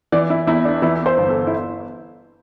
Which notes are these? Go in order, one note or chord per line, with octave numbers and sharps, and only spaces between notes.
E3 D5
E4
E2 E4
D4
E3 E4
C5
G1
A4
E4